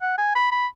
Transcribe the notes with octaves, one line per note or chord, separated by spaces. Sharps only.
F#5
G#5
B5
B5